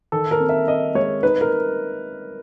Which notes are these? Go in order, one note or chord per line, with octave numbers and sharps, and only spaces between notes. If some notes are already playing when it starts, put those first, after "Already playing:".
D#3 A4
A#4
C4
E5
C4 D#5
G#3 C#5
D#4 B4
A#4